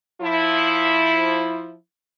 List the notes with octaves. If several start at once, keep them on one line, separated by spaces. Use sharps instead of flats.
F3 E4